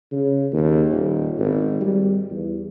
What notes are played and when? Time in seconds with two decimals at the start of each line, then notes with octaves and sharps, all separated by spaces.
0.12 C#3
0.52 D#2
0.91 D#1
1.39 G#1
1.81 G3
2.31 E2